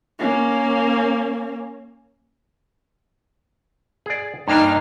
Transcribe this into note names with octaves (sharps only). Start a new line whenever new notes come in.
A#3 C#4
G#4 D5
G2 A#3 D4 D#4 F6